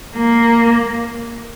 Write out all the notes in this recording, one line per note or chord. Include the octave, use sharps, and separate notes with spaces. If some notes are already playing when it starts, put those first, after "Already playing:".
A#3